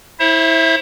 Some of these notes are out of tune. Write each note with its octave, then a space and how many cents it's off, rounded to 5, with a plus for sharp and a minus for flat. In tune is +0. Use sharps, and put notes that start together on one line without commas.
E4 -20 C5 +35 E5 +0